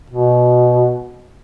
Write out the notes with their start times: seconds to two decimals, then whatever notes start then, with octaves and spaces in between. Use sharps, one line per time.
0.10 B2